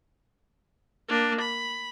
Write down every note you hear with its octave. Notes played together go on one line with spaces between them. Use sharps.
A#3 D4
B5